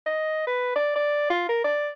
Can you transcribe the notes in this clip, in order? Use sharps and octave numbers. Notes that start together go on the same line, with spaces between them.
D#5
B4
D5
D5
F4
A#4
D5